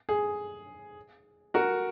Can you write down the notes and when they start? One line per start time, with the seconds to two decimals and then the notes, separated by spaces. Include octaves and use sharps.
0.09 G#4
1.54 F#4 A#4